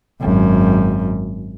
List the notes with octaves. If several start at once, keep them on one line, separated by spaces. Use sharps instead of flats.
G#1 F#2